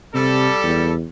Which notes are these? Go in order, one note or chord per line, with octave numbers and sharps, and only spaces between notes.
C3 G3 A4
E2